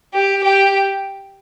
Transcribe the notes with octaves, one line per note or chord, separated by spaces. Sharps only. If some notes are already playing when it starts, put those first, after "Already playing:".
G4
G4